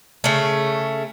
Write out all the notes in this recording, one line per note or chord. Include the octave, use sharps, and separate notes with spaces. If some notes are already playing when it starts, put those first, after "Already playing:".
C#3 A3